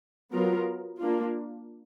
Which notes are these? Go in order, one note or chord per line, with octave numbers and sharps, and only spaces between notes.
F#3 B3 F4 A#4
A#3 D4 F4